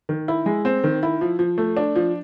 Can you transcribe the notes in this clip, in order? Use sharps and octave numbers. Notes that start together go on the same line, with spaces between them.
D#3
E4
G#3
C4
D#3
E4
F3
F3
A3
D4
F3